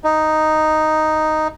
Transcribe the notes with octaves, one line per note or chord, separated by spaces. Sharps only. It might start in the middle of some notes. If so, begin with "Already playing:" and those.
D#4